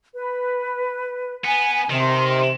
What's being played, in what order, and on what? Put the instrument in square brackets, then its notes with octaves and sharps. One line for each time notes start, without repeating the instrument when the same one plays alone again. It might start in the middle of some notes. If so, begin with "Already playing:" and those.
[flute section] B4
[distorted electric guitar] B3 [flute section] G#5
[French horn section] C3 [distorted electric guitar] D#3 [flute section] C6